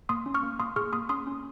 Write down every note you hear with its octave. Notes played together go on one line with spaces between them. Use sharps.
A#3 C6 D#6
C#4
C#6 F6
A#3
A#3 C6 D#6
G#4 C#6 F6
A#3 C6 D#6
C#4 C6 D#6
C#4